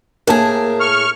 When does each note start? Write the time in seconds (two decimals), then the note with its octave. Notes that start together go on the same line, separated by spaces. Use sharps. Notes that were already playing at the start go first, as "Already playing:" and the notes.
0.27 A2 A#3 G#4 A5
0.80 C#6 F6